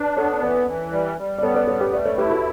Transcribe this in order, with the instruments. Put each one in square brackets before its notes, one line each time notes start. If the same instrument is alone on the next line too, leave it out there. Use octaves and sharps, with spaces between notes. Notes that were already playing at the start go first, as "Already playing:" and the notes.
Already playing: [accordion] D4 [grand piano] B4 D5
[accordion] B3 [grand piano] A4 C#5
[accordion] E3 [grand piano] B4 D5
[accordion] E3
G3
G3
[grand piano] D5
[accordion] B3 [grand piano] A4 C#5
[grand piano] B4 D5
[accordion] G3 [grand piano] A4 C#5
[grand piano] G4 B4
[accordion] A3 [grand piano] B4 D5
[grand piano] A4 C#5
[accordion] E4 [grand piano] G4 B4
[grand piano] F#4 A4